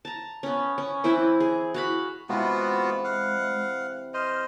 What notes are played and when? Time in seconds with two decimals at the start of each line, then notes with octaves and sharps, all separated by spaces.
0.05 A5 A#5
0.43 B3 C#4
0.78 C#4
1.04 E3 C4 E4 B4
1.40 G#4
1.74 F#4 F5 B5
2.29 C3 E3 G#3 B3 F4 F#4
3.04 F5 F#5
4.14 C5 D#5 F6